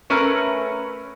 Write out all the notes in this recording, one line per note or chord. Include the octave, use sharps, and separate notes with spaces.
A3 C#4 A#4 B4